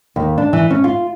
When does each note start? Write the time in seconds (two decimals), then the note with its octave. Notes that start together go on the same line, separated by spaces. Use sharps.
0.16 D#2
0.38 D4
0.53 E3
0.70 C#4
0.84 F4